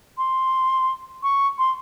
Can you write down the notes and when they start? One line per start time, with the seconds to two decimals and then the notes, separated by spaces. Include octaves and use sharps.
0.18 C6
1.23 C#6
1.58 C6